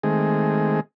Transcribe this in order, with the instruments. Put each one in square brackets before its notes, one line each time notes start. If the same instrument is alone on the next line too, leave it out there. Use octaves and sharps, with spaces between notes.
[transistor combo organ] D#3 G#3 A3 C4 G#4